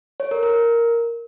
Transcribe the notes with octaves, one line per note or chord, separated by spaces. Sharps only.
C#5
A#4
A#4